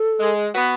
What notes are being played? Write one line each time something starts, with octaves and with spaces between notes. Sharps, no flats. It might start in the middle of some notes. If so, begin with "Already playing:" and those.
Already playing: A4
G#3
B3 F#4 B4